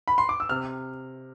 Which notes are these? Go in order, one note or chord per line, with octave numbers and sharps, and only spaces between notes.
B5
C6
D6
E6
C3 F6